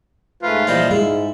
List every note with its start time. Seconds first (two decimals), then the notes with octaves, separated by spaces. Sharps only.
0.43 G#2 A3 F4 B4
0.67 A#2 E3 F3 G3 C5 D#5
0.91 G#2 G#3 E4